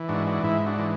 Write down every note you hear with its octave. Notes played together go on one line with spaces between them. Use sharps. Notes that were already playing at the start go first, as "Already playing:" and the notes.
Already playing: E3
G#2 D4 F#4
D4 F#4
G#2 E4
D4 F#4
E3